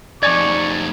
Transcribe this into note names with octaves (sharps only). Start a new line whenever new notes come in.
F2 D#4 D5 G#5 C#6 D6 G#6